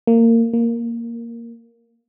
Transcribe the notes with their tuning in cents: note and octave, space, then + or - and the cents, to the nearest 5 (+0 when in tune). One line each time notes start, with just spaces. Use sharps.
A#3 -25
A#3 +0